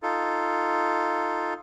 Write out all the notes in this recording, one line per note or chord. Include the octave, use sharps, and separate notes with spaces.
D#4 F4 A4